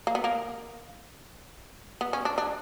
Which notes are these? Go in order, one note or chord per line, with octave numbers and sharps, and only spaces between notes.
A#3
B3
A#3
B3
C#4
D4
D4